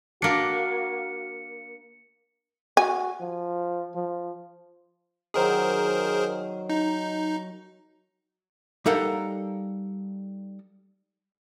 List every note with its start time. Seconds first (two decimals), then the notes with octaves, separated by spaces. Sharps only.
0.22 A#3 D4 F#4 C#7
2.77 F#4 G#5
3.21 F3
3.95 F3
5.34 D#3 F#3 G#4 A#4 C5
6.70 D#4
8.86 G3 D#4 A4 A#4 F5 F#5